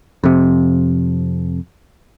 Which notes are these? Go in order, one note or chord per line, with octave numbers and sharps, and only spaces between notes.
F2 C3